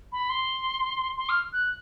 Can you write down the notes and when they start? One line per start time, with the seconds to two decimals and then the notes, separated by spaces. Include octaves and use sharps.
0.12 B5
0.29 C6
1.17 C6
1.29 F6
1.53 F#6